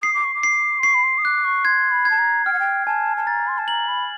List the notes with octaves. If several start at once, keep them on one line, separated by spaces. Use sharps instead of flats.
D#6 C7
D6
C#6
D6
C7
C6
C#6 C7
B5
C6
D#6
D6 F#6
C#6
C6 G#6
B5
G#6
A5
A#5
G5 F6
F#5
G5
G#5 A5
A5
A#5 A6
C6
A5
A#5 F#7
B5